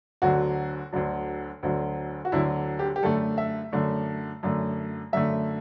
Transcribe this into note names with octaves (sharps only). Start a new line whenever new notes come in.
D2 D3 F#3 F#4
D2 D3 F#3
D2 D3 F#3
F#4
D2 D3 F#3 E4
G4
G4
F#2 D3 A3 A4
E5
F#2 D3 A3
F#2 D3 A3
F#2 D3 A3 E5